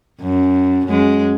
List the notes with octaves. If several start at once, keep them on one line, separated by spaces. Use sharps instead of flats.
F#2
F#2 G#3